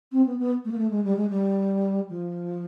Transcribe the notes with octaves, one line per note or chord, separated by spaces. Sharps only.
C4
B3
B3
A3
A#3
A3
G#3
G3
G#3
G3
F3